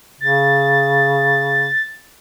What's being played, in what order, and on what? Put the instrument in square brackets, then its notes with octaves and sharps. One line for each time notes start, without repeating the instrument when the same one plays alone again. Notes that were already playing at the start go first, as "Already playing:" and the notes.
[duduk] C#3 [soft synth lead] A6